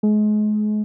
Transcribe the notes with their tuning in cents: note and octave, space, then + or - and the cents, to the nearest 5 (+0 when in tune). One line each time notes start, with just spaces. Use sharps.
G#3 +35